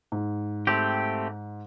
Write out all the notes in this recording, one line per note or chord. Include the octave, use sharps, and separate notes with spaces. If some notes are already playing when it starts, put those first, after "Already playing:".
G#2
A3 C4 G4